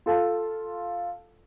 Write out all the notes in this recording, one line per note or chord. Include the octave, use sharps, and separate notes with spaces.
F4 A4 F5 A5